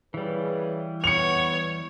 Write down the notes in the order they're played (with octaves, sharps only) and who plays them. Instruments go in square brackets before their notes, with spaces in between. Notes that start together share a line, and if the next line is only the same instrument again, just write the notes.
[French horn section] C#3 G#4 B4 [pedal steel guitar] E3 G3
[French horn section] B3 [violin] C#5 [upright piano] C#7 F7